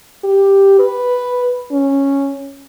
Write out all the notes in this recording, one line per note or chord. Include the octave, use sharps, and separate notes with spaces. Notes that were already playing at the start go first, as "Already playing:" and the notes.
G4
B4
C#4